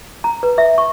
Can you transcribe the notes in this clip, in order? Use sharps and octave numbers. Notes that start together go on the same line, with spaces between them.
A#5
B4
E5
C#6